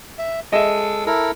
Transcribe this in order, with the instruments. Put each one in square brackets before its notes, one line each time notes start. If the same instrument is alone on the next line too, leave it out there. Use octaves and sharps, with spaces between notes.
[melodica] E5
[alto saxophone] G#3 [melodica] A4 [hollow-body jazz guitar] D#5 E5
[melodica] E4 A4 A#4